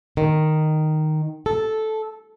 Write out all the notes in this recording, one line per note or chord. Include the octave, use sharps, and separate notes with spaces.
D#3
A4